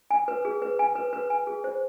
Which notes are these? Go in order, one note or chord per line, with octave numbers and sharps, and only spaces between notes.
G#5
B4
G#4
B4
G#5
B4
B4
G#5
G#4
C5